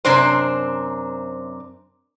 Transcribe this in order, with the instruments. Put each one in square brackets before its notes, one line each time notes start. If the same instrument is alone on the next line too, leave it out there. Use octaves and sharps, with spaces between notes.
[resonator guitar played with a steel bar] F#2 C3 C4 D4 C5